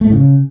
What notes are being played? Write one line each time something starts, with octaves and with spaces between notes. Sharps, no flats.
A3
A2
C#3